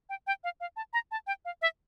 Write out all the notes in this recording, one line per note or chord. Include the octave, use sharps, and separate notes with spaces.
G5
G5
F5
F5
A5
A#5
A5
G5
F5
E5